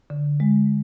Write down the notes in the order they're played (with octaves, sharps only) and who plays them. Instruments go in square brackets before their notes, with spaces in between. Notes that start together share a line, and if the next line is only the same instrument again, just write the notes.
[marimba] D3
G#3